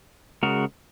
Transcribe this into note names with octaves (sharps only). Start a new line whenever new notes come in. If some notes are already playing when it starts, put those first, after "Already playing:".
C#3 G#3 F#4 A#4